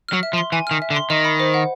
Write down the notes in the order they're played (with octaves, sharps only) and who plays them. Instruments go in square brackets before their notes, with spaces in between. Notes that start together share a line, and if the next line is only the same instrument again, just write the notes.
[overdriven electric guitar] F#3 [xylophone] F6
[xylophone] E5
[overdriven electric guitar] F3
[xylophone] C6
[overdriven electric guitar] E3 [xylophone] G#5
[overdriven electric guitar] D#3 [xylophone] F6
[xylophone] E5
[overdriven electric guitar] D3
[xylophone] C6
[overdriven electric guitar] D#3 [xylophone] D#5
[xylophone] B5
C5
F#5